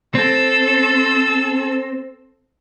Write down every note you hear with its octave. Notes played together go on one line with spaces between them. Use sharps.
C4 A4 E6